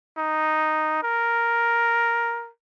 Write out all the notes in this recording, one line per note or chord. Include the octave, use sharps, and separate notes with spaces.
D#4
A#4